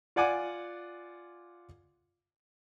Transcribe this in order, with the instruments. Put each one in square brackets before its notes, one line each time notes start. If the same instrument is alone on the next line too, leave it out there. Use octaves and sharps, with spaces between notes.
[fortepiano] F4 D5 F#5 G#5 D6